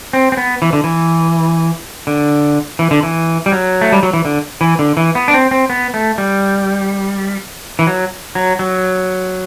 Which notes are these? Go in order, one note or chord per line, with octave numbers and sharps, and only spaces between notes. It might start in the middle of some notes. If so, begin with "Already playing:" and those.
C4
C4
B3
E3
D3
E3
D3
E3
D3
E3
G3
F#3
A3
G3
F#3
E3
D3
E3
D3
E3
B3
D4
C4
C4
B3
A3
G3
E3
F#3
F#3
F#3